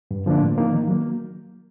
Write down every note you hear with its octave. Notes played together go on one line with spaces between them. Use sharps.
G2
D3 F3 A#3 D4
A2
F3 A#3 D#4
D#3
F#3 A#3